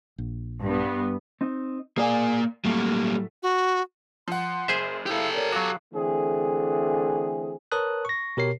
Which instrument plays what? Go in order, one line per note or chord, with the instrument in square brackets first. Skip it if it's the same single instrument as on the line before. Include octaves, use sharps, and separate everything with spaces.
[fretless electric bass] A#1
[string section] G2 B3
[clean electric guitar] C4 D#4
[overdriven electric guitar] A#3 D5 [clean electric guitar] G#4 F5 G#5
[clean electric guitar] A2 F#3 A3 [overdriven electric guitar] G3 A#3
[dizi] F#4
[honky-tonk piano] F3 F#5 [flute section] C6
[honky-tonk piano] F#1 [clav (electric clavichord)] G#4 C5 E5
[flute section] E4 F5 E6 [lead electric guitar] G4 A4
[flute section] A#4 C#5 D5
[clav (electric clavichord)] F#3 F#4 [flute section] F5 [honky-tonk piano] D6
[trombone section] D3 E3 A3 C4 G#4
[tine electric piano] A#4 B4 C#5 A5 D#6 F#6
C#6 A#6
B2 G4 A#4 C#5 C7